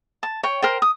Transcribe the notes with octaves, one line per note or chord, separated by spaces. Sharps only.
A5
C#5 G5
A#4 C5 G5
D#6